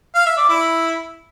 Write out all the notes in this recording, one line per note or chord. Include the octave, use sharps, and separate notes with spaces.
F5
E5
D5
E4